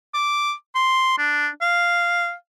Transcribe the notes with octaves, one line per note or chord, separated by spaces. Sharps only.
D6
C6
D4
F5